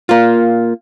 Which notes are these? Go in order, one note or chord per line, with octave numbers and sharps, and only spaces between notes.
A#3 F4